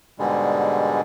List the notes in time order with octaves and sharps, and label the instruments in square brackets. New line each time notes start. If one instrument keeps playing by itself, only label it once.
[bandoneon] G#2 B2 D3 G3 G#3